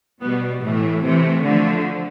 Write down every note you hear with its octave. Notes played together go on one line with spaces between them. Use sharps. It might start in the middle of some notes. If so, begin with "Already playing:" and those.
B2 G3 B3
A2 E3 A3
C3 E3 A3
D3 F3 A3